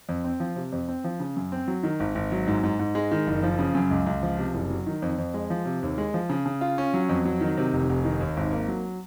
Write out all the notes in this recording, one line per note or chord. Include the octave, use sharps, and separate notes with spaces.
F2
C4
F3
C3
F2
C4
F3
C#3
F#2
C4
F#3
D#3
G#1
G#1
F#3
G#2
G#2
G#2
G#3
D#3
F#1
F3
C#3
F#2
C#2
C#2
F3
C3
F#1
F#3
D#3
F2
F2
G#3
F3
C3
D#2
G#3
F3
C#3
C#3
F4
C#4
F#3
F2
F#3
D#3
C3
F1
F1
D#3
D#2
G#1
A#3
F#3